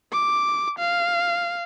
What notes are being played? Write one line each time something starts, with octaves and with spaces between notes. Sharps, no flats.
D6
F5